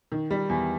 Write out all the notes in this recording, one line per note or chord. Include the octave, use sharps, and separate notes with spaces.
D#3
G3
E2